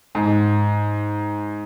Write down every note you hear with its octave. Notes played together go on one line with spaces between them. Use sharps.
G#2